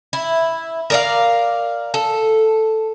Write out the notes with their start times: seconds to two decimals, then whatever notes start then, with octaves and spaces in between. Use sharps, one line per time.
0.13 E4
0.90 A#4 D5 F5
1.94 A4